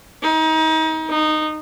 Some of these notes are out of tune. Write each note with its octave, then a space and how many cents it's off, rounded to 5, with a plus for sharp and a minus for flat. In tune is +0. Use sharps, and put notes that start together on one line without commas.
D#4 +30
D#4 -15